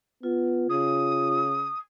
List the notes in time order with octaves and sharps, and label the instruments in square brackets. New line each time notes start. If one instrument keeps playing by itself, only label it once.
[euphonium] B3 [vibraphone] F4
[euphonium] C#3 [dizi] D#6